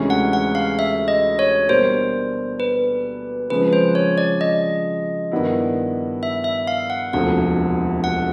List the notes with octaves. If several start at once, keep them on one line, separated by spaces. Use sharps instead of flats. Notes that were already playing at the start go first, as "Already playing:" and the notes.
Already playing: D2 C3 E3 G#3 C#4
F#5
F#5
F5
E5
D#5
C#5
B2 G3 A#3 D4 C5
B4
C#3 F3 G#3 C4 B4
C5
C#5
D5
D#5
G2 D#3 G3 B3 E4
E5
E5
F5
F#5
E1 D2 C3 F3 A3 F#5
F#5